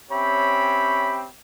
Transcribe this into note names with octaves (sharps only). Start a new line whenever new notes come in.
C4 C#4 G4 C#5 E5 B5